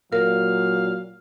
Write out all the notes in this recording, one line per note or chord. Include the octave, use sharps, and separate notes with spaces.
A#2 F#3 A#4 F5